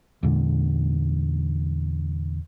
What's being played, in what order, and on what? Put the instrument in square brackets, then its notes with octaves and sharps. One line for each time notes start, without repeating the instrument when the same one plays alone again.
[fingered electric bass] E2 A#2 D3 G#3